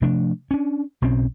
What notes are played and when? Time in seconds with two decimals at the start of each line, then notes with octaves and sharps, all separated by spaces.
0.01 C3 F3 A3 D4
0.51 C#4 D4
1.02 B1 B2 C4 C#4